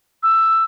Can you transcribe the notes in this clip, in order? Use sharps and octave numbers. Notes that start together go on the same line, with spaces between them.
E6